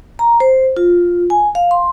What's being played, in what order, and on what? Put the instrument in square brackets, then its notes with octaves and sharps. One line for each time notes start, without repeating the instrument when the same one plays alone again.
[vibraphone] A#5
C5
F4
G#5
F5
C6